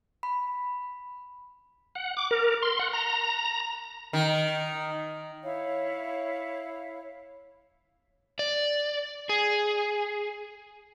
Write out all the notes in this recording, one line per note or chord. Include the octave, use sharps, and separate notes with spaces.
B5
F#5
D6
A#4
C6
F#5
A#5
D#3
E4 C#5 F5
D5
G#4